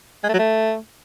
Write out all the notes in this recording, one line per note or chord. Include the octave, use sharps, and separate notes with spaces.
G#3
A3
F#3
A3